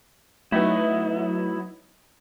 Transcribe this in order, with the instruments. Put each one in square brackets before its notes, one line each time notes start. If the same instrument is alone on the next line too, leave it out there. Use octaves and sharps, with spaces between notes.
[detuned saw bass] F#3 [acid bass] A3 [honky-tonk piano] B3 D#4 D#5 [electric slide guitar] E4